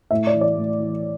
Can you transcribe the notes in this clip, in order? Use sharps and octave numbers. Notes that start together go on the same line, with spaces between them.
A2 E5
D5
E3
D5
A2
E3